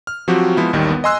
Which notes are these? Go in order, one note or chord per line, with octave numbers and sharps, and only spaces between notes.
F6
F3 F#3 C4 F#4 G4
F3 G#3 B3 E4
A1 D#2 D#3 G3
B3
D#5 G#5 C6 E6 F#6